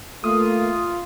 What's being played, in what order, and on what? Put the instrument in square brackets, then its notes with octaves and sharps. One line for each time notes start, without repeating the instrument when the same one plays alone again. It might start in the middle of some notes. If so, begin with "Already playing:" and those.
[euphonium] A3 [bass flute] A#3 [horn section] F4 [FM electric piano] D#6